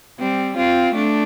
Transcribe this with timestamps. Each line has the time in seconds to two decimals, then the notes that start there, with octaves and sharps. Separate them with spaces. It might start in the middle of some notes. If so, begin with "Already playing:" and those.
0.19 G3 C4
0.56 C4 F4
0.94 A3 D4